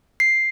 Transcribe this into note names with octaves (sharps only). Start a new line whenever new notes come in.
C7